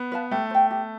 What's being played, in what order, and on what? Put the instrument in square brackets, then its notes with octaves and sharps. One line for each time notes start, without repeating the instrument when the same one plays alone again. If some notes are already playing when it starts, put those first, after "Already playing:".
Already playing: [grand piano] B3
[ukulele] B4 F5 A5
[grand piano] A3 [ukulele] G4
[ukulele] C5 G5
G4